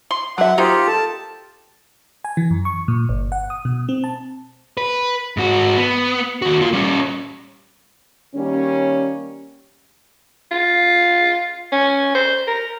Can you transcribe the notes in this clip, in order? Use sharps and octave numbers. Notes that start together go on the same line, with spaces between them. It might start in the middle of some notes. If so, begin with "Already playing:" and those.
C6
D3 F#3 E5 F#5
A#3 D#4 F4 G4 C5
A4 A5
G#5
E3
F#2
C#6
A#2
G1
F#5
D#6
B2
C4
A5
B4
G#2 F#4
B3
D#2 F#4
A#3 F4
G3 C#4
D#3 G3 A#3 C#4
F4
C#4
C5
A#4